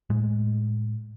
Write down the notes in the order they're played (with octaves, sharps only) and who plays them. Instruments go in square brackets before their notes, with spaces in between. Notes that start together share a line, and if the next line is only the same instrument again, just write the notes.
[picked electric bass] A2 G#3